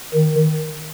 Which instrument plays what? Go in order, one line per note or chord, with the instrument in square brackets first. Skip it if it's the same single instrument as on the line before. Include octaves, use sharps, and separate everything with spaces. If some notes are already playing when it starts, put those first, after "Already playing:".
[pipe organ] D#3